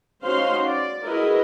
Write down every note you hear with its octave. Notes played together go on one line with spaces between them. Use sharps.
C#4 D#4 F#4 C5 F5 C6
D5
E4 F#4 G#4 A#4 B4 D#5